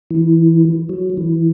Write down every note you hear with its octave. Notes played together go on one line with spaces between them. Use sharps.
E3
F#3
E3